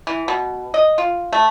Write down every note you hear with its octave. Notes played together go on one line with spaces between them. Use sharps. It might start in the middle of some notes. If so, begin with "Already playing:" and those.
E3
B2
D#5
F4
A3